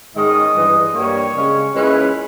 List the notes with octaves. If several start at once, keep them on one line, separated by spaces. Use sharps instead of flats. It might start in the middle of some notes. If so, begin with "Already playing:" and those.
G#2 D#3 G#3 C#4 D#5
G2 E3 G#3
G2 G3 A#3 C#5
C#3 G#3 C#4
A#2 G#3 C#4 E4 B4